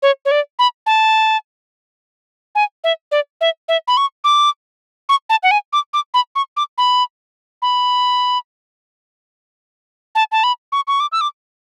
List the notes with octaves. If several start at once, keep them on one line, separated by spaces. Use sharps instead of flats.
C#5
C#5
D5
B5
A5
G#5
E5
D5
E5
E5
B5
C#6
D6
C#6
A5
F#5
G#5
D6
D6
B5
C#6
D6
B5
B5
A5
A5
B5
C#6
C#6
D6
E6
D6